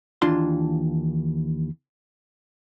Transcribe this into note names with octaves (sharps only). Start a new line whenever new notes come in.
D#2 E3 D4 F4 A5 C6